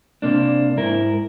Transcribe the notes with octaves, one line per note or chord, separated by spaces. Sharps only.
C3 A#3 D4
G#2 E4 A#4